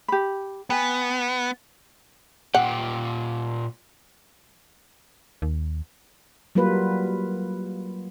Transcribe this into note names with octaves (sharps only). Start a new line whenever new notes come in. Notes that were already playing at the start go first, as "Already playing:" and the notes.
G4 B5
B3 G5 G#5
A#2 G4 F#5
D#2
F#3 G3 A#3 F4 B4